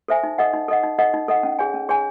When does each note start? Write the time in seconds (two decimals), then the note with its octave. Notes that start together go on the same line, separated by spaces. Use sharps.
0.08 A4 C5 E5 G#5
0.23 D#4
0.38 A4 D#5 F#5
0.53 D#4
0.68 A4 D#5 F#5
0.83 D#4
0.98 A4 D#5 F#5
1.14 D#4
1.28 A4 D#5 F#5
1.43 C#4
1.59 G#4 C#5 G#5
1.74 C#4
1.89 G#4 C#5 G#5